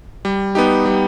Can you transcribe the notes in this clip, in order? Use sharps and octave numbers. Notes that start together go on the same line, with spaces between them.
G3
B3 D#4 G4
G3